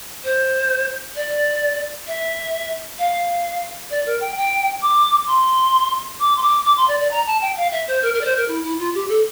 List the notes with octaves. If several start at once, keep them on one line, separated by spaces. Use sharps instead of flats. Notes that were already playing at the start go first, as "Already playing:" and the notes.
C5
D5
E5
F5
D5
A#4
G5
G5
D6
C6
D6
C6
D6
D6
C6
D5
D5
A#5
A5
G5
F5
E5
C5
A#4
A#4
D5
C5
A#4
E4
E4
F4
G4
A4